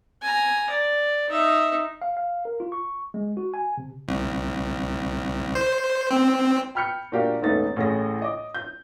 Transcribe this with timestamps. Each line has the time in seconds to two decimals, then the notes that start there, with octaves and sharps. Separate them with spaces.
0.22 G#5 A#5
0.70 D5
1.29 D#4 E5
2.02 F5
2.17 F5
2.45 A#4
2.60 F4
2.72 C#6
3.14 G#3
3.37 F#4
3.54 G#5
3.78 C3
4.08 C2
5.55 C5
6.11 C4
6.75 G5 B5 F6 G6 C#7
7.12 A#2 D4 F#4 G4 A#4 F5
7.42 D#1 G#2 A3 B3 D#4 A6
7.76 A1 A2 G#4 A#6
8.22 D#5 D6
8.54 G6